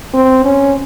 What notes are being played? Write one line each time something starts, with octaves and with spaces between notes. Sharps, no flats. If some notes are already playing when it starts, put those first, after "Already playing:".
C4
C#4